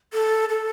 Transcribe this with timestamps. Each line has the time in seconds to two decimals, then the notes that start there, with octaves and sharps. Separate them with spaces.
0.13 A4
0.49 A4